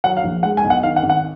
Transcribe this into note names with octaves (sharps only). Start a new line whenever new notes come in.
F#3 F#5
F5
A#1
G#3 F#5
G#5
B1
F#5
D#3 F5
F#5
G#1
F#5